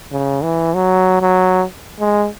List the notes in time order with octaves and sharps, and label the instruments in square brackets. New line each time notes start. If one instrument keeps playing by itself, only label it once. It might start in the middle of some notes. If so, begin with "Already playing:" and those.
[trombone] C#3
E3
F#3
F#3
G#3